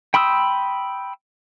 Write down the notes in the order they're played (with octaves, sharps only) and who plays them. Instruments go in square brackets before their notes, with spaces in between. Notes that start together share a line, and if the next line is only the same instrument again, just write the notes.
[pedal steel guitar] G5 B5 C6 D#6 E6